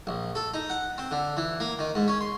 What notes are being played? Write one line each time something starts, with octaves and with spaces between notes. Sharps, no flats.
A#1
A4
D#4
F#5
C4
D3
E3
A#3
D#3
G#2
C#4
C6